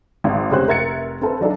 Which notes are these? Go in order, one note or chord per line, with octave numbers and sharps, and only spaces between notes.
G#1
F1 C#4 G4 C5 F#6
F1 A#4 E5 G#6 A6 C#7
C4 A4 B4
F#3 D4 D#4 A4